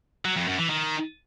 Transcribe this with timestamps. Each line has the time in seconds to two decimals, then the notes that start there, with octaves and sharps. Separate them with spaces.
0.25 F#3
0.36 F2
0.47 F#2
0.58 E3
0.70 D#3